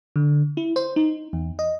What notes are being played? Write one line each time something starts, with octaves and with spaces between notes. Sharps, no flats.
D3
E4
C5
D#4
E2
D#5